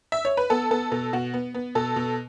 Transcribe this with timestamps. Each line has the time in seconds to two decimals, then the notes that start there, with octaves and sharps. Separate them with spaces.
0.12 E5
0.25 C#5
0.37 B4
0.50 B3 A4
0.71 B3 A4
0.92 B2 A4
1.13 B2 F#4
1.34 B3
1.54 B3
1.75 B2 A4
1.96 B2